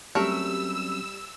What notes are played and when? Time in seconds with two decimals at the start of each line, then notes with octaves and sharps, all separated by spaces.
0.15 F#3 G3 A3 C4 C#4 A#4 E6